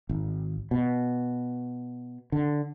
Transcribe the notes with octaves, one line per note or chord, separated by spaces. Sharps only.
G#1
B2
D3